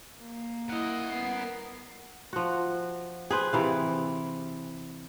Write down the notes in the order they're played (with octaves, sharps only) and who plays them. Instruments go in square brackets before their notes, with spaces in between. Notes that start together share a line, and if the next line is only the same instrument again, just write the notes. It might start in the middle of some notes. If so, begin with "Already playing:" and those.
[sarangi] A#3
[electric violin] E4 D#5 [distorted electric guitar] A#4 F#5
[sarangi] B3 [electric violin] C7
[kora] F3 F#4
G#4 B4 C5
C3 E3 F5